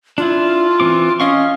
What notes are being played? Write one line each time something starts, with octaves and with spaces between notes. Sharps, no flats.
D4 E4 F4
E3 C4 D6
C#4 D#5 F5 C#6